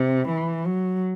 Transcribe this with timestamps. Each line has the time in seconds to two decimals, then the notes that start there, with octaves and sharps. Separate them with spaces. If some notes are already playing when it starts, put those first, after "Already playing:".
Already playing: C3
0.29 E3
0.67 F#3